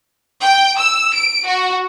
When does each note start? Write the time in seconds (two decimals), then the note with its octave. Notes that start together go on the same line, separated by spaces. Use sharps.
0.43 G5
0.79 E6
1.15 D7
1.47 F#4